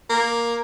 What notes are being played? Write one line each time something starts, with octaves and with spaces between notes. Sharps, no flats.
A#3